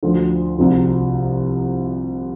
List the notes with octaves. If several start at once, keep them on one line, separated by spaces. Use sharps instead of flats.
D2 D3 F3
C2 C3 F3